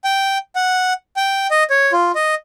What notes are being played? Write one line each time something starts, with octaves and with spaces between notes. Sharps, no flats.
G5
F#5
G5
D#5
C#5
F4
D#5